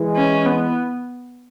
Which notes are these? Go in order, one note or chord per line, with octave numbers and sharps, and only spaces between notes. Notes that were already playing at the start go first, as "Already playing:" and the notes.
Already playing: E3 G#3
C#4
B3